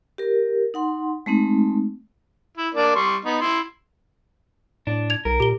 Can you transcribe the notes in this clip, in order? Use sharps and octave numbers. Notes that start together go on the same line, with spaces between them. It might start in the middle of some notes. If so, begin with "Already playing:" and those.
G4 A#4
D#4 F#5 C6
G#3 A3 C4 D#4
E4
A#3 D4 D5
G3 C6 C#6
B3 D#4
E4 C6
A2 D4
G#6 F7
B1 A#4
A#2 G4 G7